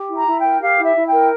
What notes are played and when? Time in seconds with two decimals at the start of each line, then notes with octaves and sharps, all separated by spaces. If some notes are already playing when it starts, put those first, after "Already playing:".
Already playing: G4
0.09 E4
0.16 A#5
0.27 E4
0.37 G5
0.44 A#4
0.61 G4 F5
0.77 E4
0.84 E5
0.95 E4
1.06 G5
1.11 A#4